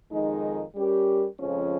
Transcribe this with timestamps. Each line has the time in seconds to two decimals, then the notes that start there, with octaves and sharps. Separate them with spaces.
0.12 F2 D#3 G#3 D#4
0.75 G3 C#4 G4 A#4
1.40 F2 C#3 F3 G#3 C#4